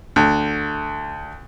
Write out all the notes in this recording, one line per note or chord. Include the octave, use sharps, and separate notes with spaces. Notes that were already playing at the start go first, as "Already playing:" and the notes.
D2